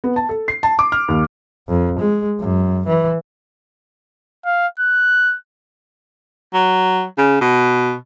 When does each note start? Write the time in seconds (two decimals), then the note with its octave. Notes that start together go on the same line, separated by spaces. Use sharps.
0.04 B3
0.16 A5
0.29 A4
0.48 C7
0.63 A5
0.79 D6
0.92 F6
1.08 D#2
1.69 F2
1.99 G#3
2.40 F#2
2.87 E3
4.45 F5
4.79 F#6
6.54 F#3
7.18 C#3
7.41 B2